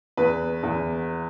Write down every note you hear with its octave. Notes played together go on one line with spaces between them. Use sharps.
E2 B4
E2